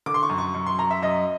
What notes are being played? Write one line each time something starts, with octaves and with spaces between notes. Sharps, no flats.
D3 D6
C6
C#6
F#2
C#6
F#2 C#6
C6
F#2 A#5
E5
F#2 D#5